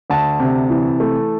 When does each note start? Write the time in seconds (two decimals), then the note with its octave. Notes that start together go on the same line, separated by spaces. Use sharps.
0.10 D2 A5
0.39 C3
0.70 E3
1.00 A3